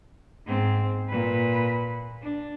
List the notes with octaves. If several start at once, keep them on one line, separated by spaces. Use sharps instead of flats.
G#2 C4
A#2 B4
D4